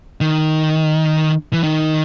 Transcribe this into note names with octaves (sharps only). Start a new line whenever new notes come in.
D#3
E3
D#3